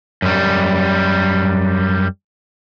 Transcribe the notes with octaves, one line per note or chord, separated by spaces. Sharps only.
F#2 G3